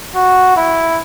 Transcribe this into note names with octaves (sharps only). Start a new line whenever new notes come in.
F#4
E4